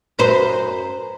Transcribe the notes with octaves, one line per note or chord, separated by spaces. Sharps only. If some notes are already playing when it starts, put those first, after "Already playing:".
F#2 B4 C5